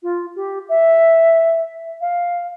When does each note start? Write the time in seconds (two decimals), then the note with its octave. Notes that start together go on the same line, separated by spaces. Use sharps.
0.03 F4
0.36 G4
0.69 E5
2.01 F5